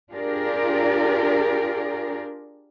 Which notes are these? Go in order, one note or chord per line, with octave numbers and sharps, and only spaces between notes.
D4 F4 G4 G#4 A#4 D5